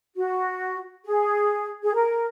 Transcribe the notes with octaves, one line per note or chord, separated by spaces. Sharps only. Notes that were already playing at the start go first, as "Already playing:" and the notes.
F#4
G#4
G#4
A#4